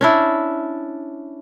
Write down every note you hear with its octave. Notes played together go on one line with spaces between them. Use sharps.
C#4 D4 E4